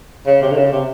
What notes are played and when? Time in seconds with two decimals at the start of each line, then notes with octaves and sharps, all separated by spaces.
0.27 C#3
0.42 C3
0.51 D3
0.57 C#3
0.72 C3